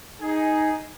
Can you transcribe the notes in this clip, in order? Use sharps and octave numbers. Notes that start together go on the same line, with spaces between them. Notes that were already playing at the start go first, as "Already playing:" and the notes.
D#4 G#4